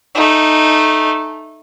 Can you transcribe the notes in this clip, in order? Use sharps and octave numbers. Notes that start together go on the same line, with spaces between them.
A3 D#4